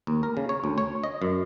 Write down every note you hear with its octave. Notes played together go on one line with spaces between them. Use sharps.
D#2
A#4
C#3
C#5
D2
C#5
D#5
F#2